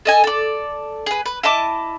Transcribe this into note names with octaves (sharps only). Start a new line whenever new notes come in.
A4 D#5 G#5
A4 D5
G#4 B4
B4
E4 D#5 A5 D6